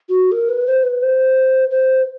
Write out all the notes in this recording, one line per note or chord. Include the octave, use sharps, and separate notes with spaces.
F#4
A#4
B4
C5
B4
C5
C5